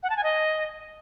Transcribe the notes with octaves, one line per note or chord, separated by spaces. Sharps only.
F#5
A5
G#5
D#5